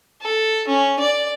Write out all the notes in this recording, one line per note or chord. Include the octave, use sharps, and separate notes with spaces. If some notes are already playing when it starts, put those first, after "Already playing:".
A4
C#4
D5